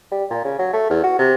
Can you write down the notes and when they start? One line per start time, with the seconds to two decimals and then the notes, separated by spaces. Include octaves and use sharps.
0.12 G3
0.30 A#2
0.44 C#3
0.59 F#3
0.73 A3
0.90 E2
1.04 F#4
1.19 C3